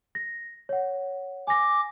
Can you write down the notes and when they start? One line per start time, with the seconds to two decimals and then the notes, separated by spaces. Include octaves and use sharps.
0.15 A#6
0.69 C#5 F#5
1.47 G#5 D6 A#6